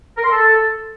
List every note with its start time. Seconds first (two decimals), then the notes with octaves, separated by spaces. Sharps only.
0.17 A#4
0.24 C6
0.31 A4